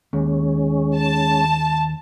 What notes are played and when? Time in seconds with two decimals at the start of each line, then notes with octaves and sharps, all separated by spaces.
0.13 D#2 G#3 C#4
0.95 A5